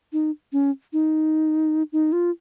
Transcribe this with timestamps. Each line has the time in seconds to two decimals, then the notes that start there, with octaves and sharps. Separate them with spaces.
0.12 D#4
0.52 C#4
0.93 D#4
1.92 D#4
2.12 F4